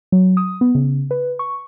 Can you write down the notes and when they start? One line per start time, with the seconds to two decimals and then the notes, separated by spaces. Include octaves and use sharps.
0.12 F#3
0.37 D#6
0.61 B3
0.75 C#3
1.11 B4
1.39 C#6